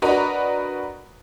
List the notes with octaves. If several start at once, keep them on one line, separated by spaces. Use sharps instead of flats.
D4 F#4 A#4 B4 D#5 A#5